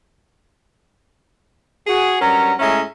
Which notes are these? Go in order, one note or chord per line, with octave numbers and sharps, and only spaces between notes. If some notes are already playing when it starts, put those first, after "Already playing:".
F#4 G#4
G2 F#3 C#4 A#4 A#5
A2 G#3 C#4 E5 A#5